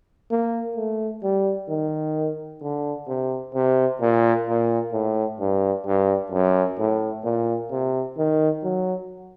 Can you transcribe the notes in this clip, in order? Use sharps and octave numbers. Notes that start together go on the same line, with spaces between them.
A#3
A3
G3
D#3
D3
C3
C3
A#2
A#2
A2
G2
G2
F#2
A2
A#2
C3
D#3
F#3